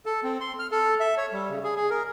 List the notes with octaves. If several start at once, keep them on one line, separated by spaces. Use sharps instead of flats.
A4
C4
C6
F6
A4
E5
C#5
G3
C#3
G#4
G#4
A#4